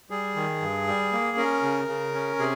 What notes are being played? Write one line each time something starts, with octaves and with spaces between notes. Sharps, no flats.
G3 G#4
D#3
G2
G3
A#3
C#4 A#4
C#3
C#3
C#4
C3 G#4